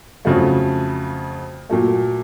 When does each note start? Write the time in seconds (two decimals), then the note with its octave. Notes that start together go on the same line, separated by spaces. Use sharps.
0.25 F2 C#3 F#3 A3
1.70 A#2 F#3 A3